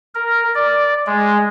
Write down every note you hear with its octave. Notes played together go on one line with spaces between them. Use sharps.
A#4
D5
G#3